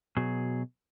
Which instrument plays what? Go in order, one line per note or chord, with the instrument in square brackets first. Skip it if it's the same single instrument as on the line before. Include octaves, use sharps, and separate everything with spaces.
[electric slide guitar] B2 F#3 G#4